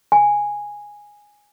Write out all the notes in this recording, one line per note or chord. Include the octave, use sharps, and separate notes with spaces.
G#5